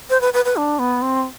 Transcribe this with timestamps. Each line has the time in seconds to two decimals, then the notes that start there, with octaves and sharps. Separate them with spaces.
0.10 C5
0.21 B4
0.33 B4
0.45 B4
0.57 D4
0.79 B3
1.02 C4